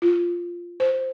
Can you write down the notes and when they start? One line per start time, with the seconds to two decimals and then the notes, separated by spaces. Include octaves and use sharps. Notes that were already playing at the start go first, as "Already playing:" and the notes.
0.02 F4
0.80 C5